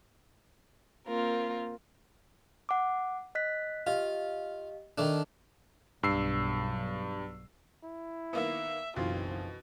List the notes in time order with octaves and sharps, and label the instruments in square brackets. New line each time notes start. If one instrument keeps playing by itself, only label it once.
[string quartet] A#3 C4 F4 A#4
[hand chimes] F#5 D6
D#5 F#6 B6
[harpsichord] F4 [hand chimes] G4 D#5 F5
[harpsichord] D#3 A3 D4
[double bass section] B1 [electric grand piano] G2 E6 C7
[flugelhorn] E4
[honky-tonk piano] D#3 A#3 B3 [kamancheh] E5
[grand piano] F#1 B1 B4 [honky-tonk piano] B2 E3 [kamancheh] C4 [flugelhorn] F4
[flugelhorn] F3